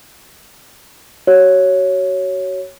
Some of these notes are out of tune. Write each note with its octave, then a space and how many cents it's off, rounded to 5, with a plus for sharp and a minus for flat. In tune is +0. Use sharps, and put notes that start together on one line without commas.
F#4 +30 C#5 +0